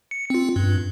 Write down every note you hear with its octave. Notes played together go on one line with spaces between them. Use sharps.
C#7
C4 F4
G2